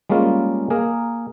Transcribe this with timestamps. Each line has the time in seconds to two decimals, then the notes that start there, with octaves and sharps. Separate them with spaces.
0.10 G3 G#3 A#3 C#4 F4
0.70 A#3 G#4 A#4